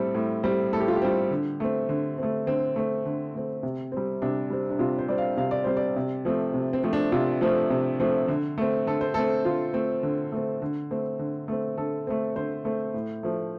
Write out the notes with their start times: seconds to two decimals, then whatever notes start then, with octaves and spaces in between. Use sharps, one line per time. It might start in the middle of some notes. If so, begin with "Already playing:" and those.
Already playing: A2 G3 C4 A4
0.15 A2
0.44 G3 C4
0.73 A2 A4
0.80 G4
0.88 F4
0.96 G4
1.02 G3 C4
1.31 D3
1.60 A3 C4
1.89 D3
2.18 A3 C4
2.47 D3 C4
2.76 A3 C4
3.06 D3
3.35 A3 C4
3.63 C3
3.92 G3 C4
4.22 C3 D4
4.50 G3 C4
4.70 D4
4.79 C3 F4
4.99 C5
5.08 G3 C4 D5
5.18 F5
5.37 C3 F5
5.51 D5
5.64 G3 C4 C5
5.77 D5
5.96 C3
6.25 F3 A3 C4
6.54 C3
6.73 C4
6.83 F3 A3 C4
6.93 D4
7.12 C3 F4
7.41 F3 A3 C4
7.70 C3
8.00 F3 A3 C4
8.28 D3
8.58 A3 C4
8.87 D3 A4
9.01 C5
9.14 A3 C4 A4
9.45 D3 F4
9.74 A3 C4
10.03 D3
10.32 A3 C4
10.62 D3
10.91 A3 C4
11.19 D3
11.48 A3 C4
11.77 D3 A4
12.07 A3 C4
12.36 D3 C5
12.65 A3 C4
12.94 A2
13.23 F3 A3